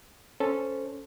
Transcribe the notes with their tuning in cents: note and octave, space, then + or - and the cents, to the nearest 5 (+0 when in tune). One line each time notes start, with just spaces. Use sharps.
C#4 +0 A4 +0 C5 -10